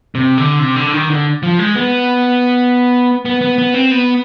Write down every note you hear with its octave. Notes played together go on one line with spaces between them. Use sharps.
C3
D3
C3
D3
D#3
D3
F3
G#3
B3
B3
B3
B3
C4
B3